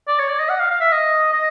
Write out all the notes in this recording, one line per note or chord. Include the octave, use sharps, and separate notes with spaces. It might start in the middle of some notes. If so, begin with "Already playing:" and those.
D5
C#5
D5
D#5
F#5
F5
F5
E5
D#5
D#5